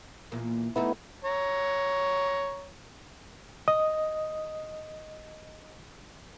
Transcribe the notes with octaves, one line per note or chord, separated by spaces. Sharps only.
E2 A#2 A#3
E3 A3 B3 D#4 E4
C#5 A#5
D#5 D#6